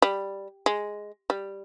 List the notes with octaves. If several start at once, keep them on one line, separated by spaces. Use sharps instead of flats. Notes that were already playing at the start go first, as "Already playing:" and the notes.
G3
G#3
G3